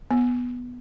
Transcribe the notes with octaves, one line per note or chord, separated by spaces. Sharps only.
B3